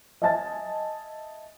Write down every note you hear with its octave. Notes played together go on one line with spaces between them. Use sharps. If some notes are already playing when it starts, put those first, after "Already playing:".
D#5 E5 G#5 A5 A6